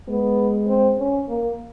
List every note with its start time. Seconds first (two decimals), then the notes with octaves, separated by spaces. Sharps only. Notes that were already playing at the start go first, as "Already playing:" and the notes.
0.08 G#3 B3
0.68 C4
0.99 C#4
1.29 A#3